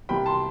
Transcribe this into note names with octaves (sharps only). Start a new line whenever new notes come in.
C2 C3 G3 G5 B5
A5 C6